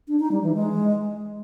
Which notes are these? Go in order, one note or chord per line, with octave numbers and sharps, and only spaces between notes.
D4
D#4
G3
E3
G#3